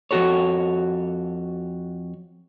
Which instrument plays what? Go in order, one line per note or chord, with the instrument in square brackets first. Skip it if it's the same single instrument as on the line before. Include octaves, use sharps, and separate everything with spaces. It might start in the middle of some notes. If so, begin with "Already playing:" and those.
[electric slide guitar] F2 G#2 F#4 A4 C#5